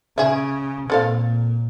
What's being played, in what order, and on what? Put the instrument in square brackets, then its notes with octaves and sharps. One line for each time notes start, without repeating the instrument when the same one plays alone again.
[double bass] C#3 [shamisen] G#4 E5
[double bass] A#2 [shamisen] C4 A4 F5